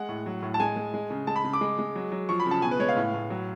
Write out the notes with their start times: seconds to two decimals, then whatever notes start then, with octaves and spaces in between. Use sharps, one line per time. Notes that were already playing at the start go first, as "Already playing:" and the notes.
Already playing: G#3 F#5
0.09 A2
0.26 F#3
0.43 A2
0.54 A5
0.60 G#3 G#5
0.76 G#3
0.94 G#3
1.10 C#3
1.27 G#3 A5
1.36 B5
1.45 C#3
1.53 D6
1.61 G#3
1.79 G#3
1.95 F#3
2.12 F#3
2.29 F3 C#6
2.40 B5
2.46 C#3 A5
2.62 B2 G#5
2.71 B4
2.79 G#3 C#5
2.89 F5
2.97 A2
3.14 A2
3.30 F#3